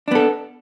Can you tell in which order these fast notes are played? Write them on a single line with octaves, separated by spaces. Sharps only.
D4 B3 A4